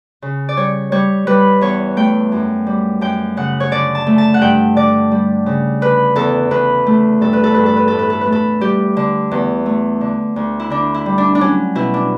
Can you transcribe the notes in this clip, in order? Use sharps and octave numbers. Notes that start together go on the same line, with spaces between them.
C#3
D5
G3 C#5
G3 C#5
G3 B4
E2 C#5
A3 G5
F#2
G3
F#2 G5
C#3 F#5
C#5
D3 D5
A5
A3
A5
F#5
G2 G5
D3 D5
G3
C#3
D3 B4
E2 A4
E2 B4
A3
G2 A4
B4
A4
G2 B4
A4
B4
A2 A4
B4
A4
B4
A3
A4
G3 G4
D3
E2
A3
D3
D2
E4
D3 D4
E4
G3
D4
D4
F#3 C#4
B2 E4
D4